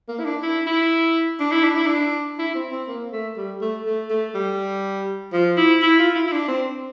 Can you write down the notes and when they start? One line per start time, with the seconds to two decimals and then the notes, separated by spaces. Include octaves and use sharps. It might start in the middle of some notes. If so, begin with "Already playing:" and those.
0.09 A#3
0.19 E4
0.25 D4
0.42 E4
0.67 E4
1.40 D4
1.52 E4
1.64 D4
1.76 E4
1.87 D4
2.39 E4
2.55 C4
2.72 C4
2.88 A#3
3.12 A3
3.37 G3
3.62 A3
3.86 A3
4.10 A3
4.35 G3
5.33 F3
5.57 E4
5.82 E4
5.99 F4
6.15 E4
6.28 E4
6.32 D4
6.48 C4